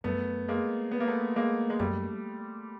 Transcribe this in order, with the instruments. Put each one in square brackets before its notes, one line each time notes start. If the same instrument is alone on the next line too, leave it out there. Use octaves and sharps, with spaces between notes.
[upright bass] F#2 [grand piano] A3 B3
[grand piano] G#3 A#3
B3
A#3
A3 B3
G#3 A#3
G#3
[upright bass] F#2 [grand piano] G3 A3